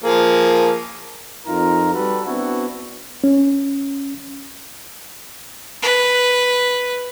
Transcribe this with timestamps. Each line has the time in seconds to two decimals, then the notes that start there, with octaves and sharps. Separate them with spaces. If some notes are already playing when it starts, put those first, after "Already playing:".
0.04 F3 A#3 G#4
1.46 F2 D#4 F4 A#4 A#5
1.93 G3 F#4 G4 A4 B4
2.26 B3 C4 D4 E4 F#4
3.24 C#4
5.82 B4